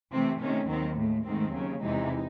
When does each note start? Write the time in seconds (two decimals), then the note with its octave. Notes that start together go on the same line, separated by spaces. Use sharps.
0.12 C3 E3 A3 C4
0.41 C3 D#3 A3 C#4
0.68 D#2 D#3 F#3 C4
0.97 A2 G#3 A3
1.25 G#2 D#3 A3 C4
1.52 D#2 C#3 F#3
1.81 E2 C3 E3 G#3 D#4